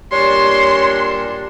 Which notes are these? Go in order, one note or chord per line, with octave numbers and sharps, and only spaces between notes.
A#2 G3 D4 C#5 C6